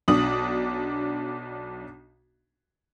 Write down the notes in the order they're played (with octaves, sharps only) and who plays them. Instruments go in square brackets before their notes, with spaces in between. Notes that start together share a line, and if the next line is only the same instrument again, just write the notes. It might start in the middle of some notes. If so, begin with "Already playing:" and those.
[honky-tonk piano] B1 F#3 D4 D#6 F#7